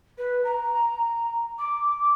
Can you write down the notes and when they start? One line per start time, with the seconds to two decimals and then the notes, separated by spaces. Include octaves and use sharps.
0.18 B4
0.44 A#5
1.59 D6